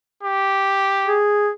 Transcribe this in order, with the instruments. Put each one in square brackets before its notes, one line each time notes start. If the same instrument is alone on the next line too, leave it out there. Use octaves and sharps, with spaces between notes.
[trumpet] G4
[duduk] G#4